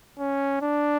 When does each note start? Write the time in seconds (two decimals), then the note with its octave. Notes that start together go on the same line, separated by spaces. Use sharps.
0.19 C#4
0.62 D4